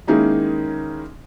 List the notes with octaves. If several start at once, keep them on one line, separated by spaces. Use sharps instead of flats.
D#3 G#3 A#3 C#4 D#4 E4